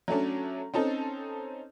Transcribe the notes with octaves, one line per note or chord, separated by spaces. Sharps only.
F#3 A3 C#4 D4
C4 C#4 D#4 A4